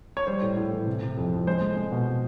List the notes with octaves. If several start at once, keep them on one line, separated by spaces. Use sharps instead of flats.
C#5
G3 C5
A2
A2
E3
C3
C3
F2
F2
G#3 C5
G#3
G#3
B2